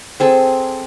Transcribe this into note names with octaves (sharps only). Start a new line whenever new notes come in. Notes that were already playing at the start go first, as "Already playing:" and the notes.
C4 G#4 A4